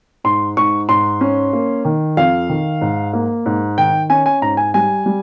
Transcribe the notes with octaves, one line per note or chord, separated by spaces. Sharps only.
G#2 C6
G#2 C#6
G#2 C6
C#4
A#3
D#3
F2 F5
D#3
G#2
A#3
G#2
D#3 G5
C#4 G#5
G#5
G#2 A#5
G#5
G3 G#5
G3